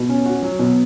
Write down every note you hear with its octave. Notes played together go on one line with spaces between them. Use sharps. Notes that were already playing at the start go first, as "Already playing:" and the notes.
Already playing: B2
C#4
F#4
F#3
B2